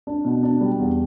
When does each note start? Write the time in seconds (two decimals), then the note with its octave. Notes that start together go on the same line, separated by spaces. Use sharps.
0.07 D4
0.25 B2
0.43 D4
0.61 G3
0.79 E2